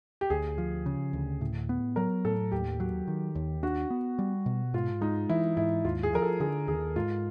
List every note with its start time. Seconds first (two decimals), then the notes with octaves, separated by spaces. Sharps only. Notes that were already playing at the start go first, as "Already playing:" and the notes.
0.21 G4
0.30 D2 G#4
0.58 F3
0.86 C#3
1.13 D2
1.41 A2
1.69 B3
1.96 F#3 A#4
2.25 A2 A4
2.52 D#2 G4
2.80 F#3
3.07 D#3
3.35 D#2
3.63 D4 F#4
3.90 B3
4.19 G3
4.46 B2
4.74 G#2 F4
5.01 G#3 D#4
5.29 E3 E4
5.57 G#2 E4
5.84 D#2 F4
6.03 G#4
6.13 F3 A#4
6.22 A4
6.40 D3 G#4
6.68 D#2 G#4
6.96 G#2 F4